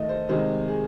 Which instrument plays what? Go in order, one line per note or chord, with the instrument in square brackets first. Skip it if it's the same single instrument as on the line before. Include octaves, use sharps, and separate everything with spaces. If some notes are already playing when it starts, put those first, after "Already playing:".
Already playing: [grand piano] D#3 A3 D#5
C5
C3 D#3 G#3 C5
G#4